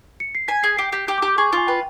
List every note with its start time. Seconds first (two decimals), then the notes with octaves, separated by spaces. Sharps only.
0.20 C#7
0.35 C7
0.48 G#5 B6
0.63 G#4 C7
0.77 G4 C7
0.92 G4 B6
1.07 G4 G6
1.18 D6
1.22 G4
1.28 D6
1.38 G#4 C#6
1.53 F4 G#5
1.67 B4 G5